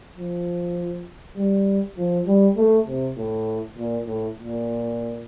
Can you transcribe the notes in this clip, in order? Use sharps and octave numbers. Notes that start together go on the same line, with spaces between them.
F3
G3
F3
G3
A3
C3
A2
A#2
A2
A#2